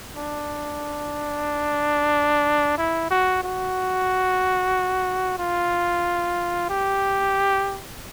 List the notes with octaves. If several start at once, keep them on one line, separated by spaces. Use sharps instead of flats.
D4
E4
F#4
F#4
F4
G4